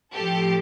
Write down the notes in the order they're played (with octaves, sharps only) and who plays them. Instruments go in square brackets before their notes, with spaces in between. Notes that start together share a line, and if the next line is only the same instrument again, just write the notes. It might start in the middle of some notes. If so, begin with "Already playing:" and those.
[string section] A2 F3 G4 A4